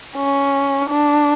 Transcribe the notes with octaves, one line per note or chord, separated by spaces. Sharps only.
C#4
D4